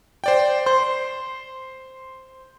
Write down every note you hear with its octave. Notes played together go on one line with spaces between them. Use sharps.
C5 D5 G5
C5 C6